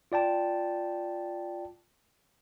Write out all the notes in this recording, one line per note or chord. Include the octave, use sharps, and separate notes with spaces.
F4 D5 G5 A5